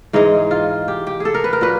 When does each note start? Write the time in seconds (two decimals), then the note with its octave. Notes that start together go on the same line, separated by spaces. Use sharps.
0.13 G#2 E3 G#3 D#4
0.51 F4
0.88 G4
1.07 G4
1.20 G#4 A4
1.34 A#4
1.44 B4
1.53 A#4
1.61 A#2 F#3 B4